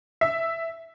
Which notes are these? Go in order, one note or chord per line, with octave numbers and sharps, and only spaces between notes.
E5